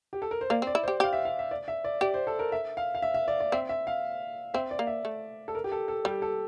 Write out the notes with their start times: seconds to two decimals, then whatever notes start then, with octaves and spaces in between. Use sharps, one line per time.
0.13 G4
0.22 A4
0.31 A#4
0.41 C5
0.50 A#3 D5
0.62 C4 D5
0.75 E4
0.83 C5
0.88 G4
1.00 G4 F5
1.13 E5
1.25 F5
1.39 E5
1.51 D5
1.68 E5
1.84 D5
2.01 G4 D5
2.14 C5
2.27 A4
2.39 A#4
2.52 E5
2.77 F5
2.95 F5
3.02 E5
3.14 E5
3.28 D5
3.40 D5
3.52 C4 E5
3.69 E5
3.87 F5
4.54 C4 E5
4.71 D5
4.79 A#3
4.87 E5
5.05 A3
5.48 A4
5.55 A#4
5.64 G4
5.72 A4
5.88 A4
6.05 G3 G4
6.22 A4